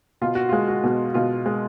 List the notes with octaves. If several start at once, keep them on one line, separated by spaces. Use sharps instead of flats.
B2 F4
F#4
F4
G#3
F#4
B2
B2 F4
G#3